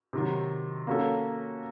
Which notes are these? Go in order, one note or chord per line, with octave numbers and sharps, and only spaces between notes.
C3 D#3 F#3
A#3 C#4 F#4 A4